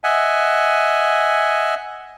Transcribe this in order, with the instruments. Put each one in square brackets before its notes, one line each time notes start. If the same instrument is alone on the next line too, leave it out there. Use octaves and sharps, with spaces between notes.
[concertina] D#5 E5 F#5 G#5